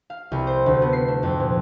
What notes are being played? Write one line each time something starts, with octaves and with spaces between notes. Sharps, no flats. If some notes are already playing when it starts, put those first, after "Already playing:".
F5
C2
C5
D2
B3
C7
A3
F2
A#2